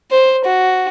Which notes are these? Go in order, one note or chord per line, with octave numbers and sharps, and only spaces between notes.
C5
F#4